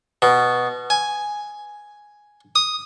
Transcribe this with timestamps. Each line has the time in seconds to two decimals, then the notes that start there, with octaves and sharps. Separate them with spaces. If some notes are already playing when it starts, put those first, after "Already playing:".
0.22 B2
0.90 G#5
2.56 D#6